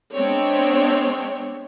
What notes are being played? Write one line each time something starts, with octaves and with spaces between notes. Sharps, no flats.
G#3 B3 C4 D4 C#5